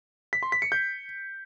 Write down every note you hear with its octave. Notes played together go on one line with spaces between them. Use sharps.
B6
C6
B6
C#7
G6